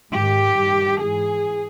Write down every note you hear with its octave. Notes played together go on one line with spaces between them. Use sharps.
G#2 D#3 G4
G2 D#3
G#2 E3 G#4